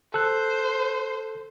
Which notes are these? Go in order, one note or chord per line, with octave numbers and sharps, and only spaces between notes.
A4 C5 F#6